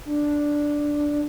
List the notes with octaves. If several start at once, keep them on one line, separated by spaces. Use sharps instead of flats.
D4